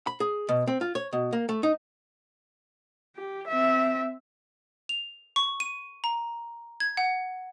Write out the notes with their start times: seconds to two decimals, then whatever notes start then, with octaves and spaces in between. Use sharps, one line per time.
0.07 B5
0.20 G#4
0.49 B2
0.67 C4
0.81 F4
0.95 C#5
1.13 B2
1.33 A#3
1.49 A3
1.63 D#4
3.16 G4
3.48 C4 E5
4.89 F7
5.36 C#6
5.60 D#7
6.04 A#5
6.80 G#6
6.97 F#5